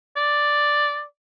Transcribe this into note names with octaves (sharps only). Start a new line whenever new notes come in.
D5